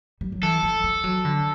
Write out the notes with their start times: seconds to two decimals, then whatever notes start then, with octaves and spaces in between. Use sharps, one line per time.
0.21 G3
0.32 F#3
0.43 E3 A4
0.63 G3
0.84 G3
1.04 F#3
1.25 D3